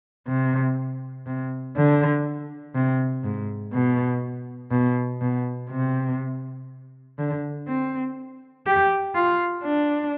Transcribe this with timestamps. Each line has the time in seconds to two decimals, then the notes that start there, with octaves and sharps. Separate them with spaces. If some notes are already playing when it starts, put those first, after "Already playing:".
0.28 C3
1.26 C3
1.77 D3
2.75 C3
3.24 G#2
3.73 B2
4.71 B2
5.21 B2
5.70 C3
7.18 D3
7.68 C4
8.67 G4
9.16 F4
9.64 D4